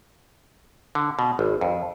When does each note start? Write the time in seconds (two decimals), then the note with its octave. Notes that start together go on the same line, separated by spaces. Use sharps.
0.95 D3
1.19 B2
1.39 G#1
1.61 F2